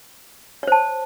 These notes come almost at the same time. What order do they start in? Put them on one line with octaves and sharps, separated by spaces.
C#5 C5 A5